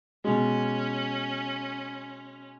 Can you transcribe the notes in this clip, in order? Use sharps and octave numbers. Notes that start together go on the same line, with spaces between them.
B2 G#3 C#4